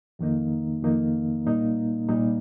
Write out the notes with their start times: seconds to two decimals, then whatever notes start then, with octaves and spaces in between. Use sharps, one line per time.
0.19 F2 D#3 A#3 D#4
0.82 F2 D#3 A#3 D#4
1.45 C2 A#2 G3 A#3 D#4
2.08 C2 A#2 G3 A#3 D#4